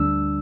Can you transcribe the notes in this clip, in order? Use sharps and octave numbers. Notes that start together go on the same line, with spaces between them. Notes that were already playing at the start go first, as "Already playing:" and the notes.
Already playing: D2 D3 G3 D4 E6